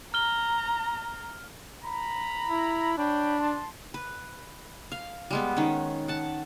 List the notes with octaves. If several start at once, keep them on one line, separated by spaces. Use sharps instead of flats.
A#5 F6 G7
A#5 B5
E4
D4 C#5 G5 B5
A5 C6
B4
F5
G3 G#3 B3
D#3 C#4
F#5 A5